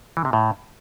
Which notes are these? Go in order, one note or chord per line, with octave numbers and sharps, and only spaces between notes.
E3
C3
A2